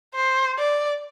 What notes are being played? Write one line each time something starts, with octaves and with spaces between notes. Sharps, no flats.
C5
D5